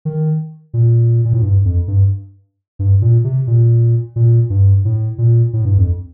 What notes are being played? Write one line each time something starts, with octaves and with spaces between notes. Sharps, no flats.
D#3
A#2
A#2
A2
G2
F2
G2
G2
A#2
C3
A#2
A#2
G2
A2
A#2
A2
G2
F2